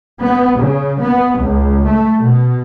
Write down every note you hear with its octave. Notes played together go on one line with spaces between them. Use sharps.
B3
C#3
B3
C#2
A3
B2